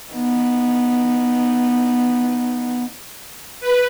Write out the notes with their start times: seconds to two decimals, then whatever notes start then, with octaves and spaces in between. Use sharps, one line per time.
0.13 B3 D#4
3.60 B4